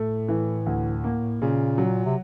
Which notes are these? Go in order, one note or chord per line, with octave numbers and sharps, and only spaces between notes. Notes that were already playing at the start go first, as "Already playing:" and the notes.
Already playing: A2 A3
E3
D2
A#3
A#2 C#3
F#3
C3